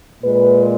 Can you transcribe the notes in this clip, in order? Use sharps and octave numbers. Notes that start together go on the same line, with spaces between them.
A#2 G#3 B4